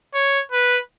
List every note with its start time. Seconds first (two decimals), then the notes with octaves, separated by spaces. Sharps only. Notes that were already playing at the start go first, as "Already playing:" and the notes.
0.14 C#5
0.52 B4